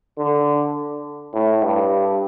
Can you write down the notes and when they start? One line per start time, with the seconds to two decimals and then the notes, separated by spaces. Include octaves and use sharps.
0.18 D3
1.34 A2
1.63 G2